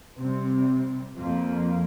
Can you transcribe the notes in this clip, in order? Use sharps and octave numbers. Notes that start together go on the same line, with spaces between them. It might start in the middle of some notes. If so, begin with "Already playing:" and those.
C3 G3 C4
F2 F3 A#3